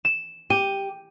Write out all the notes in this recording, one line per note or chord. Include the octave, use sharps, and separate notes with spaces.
E7
G4 D#7